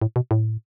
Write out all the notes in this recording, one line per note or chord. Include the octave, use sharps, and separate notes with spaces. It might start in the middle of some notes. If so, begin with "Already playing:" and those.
A2
B2
A2